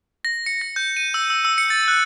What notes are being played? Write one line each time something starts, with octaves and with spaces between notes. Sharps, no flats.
A#6
C#7
A#6
G6
D#7
E6
E6
E6
C#7
A6
F#6